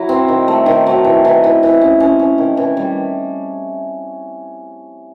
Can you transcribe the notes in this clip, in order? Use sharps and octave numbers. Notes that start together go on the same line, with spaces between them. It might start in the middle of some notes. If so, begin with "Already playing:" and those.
Already playing: F#3 E4
C4
D#3
A3
D#3
F#3
E3
E3
E3
E3
C#4
C#4
C#4
D#3
E3
G3